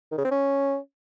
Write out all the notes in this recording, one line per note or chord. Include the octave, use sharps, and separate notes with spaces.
D#3
C#3
C4
C#4